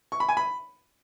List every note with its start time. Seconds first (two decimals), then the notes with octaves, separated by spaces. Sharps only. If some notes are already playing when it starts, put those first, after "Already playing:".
0.12 C#6
0.20 B5
0.29 G#5
0.37 B5